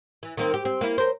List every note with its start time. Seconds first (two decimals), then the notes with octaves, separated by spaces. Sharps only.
0.23 E3
0.37 D#3 A#3 C4
0.54 G4
0.65 C4
0.81 A#3 E4
0.98 A#4 C5